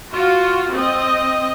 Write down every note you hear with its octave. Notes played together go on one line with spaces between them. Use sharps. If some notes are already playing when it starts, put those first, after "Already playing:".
F4 F#4
C4 D#5